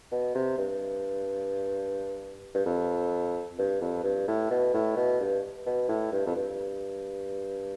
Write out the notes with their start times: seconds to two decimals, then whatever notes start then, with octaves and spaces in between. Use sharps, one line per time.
0.12 B2
0.35 C3
0.58 G2
2.55 G2
2.66 F2
3.58 G2
3.81 F2
4.04 G2
4.28 A2
4.51 B2
4.74 A2
4.96 B2
5.20 G2
5.66 B2
5.89 A2
6.12 G2
6.27 F2
6.36 G2